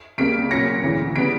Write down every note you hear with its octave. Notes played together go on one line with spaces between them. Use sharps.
C#2 C#3 G3 A#3 B6 D7
A#2 F#3 C#4 A#6 C#7
D2 C#3 E3
C#3 G3 B3 B6 D7